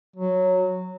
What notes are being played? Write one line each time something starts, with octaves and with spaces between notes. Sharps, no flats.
F#3